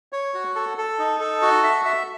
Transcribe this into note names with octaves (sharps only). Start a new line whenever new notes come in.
C#5
F#4
A4
A4
D#4
A4
F#4
E5
E5